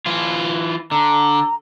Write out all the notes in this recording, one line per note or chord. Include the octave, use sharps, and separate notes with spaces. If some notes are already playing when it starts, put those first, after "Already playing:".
E3 F4
D3 A#5